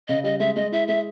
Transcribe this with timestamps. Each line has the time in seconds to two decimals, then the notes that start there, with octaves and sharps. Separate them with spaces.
0.08 C#3 D#5
0.24 G3 D#5
0.40 G#3 E5
0.56 G#3 D#5
0.72 E4 E5
0.88 G#3 E5